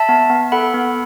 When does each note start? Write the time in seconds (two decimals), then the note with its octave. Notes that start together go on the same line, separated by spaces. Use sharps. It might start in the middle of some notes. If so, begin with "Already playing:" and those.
Already playing: E5 A5
0.09 B3
0.30 B3
0.52 A4 F#5 B5
0.74 B3